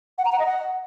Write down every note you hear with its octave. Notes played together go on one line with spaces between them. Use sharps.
F#5
A#5
F#5
D#5
F#5